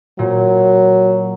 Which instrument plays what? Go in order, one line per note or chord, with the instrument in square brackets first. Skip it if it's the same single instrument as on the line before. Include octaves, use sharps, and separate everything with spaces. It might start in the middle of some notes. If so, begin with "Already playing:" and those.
[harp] A#2 [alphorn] F#3